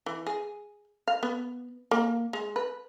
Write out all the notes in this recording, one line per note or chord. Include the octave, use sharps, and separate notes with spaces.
E3
G#4
F5
B3
A#3
G#3
B4